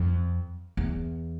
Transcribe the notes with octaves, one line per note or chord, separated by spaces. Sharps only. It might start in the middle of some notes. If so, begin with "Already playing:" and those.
Already playing: F2
E2